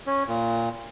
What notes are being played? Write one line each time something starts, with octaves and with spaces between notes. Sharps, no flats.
C#4
A#2